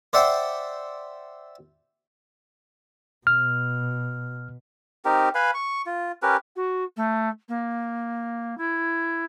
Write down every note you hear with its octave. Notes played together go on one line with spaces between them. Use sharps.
C5 D5 E5 F#5 G5 C6
B2 F6
C4 D#4 G4 A#4
B4 F5 G#5 B5
C#6
F4
C#4 G4 A#4 B4
F#4
A3
A#3
E4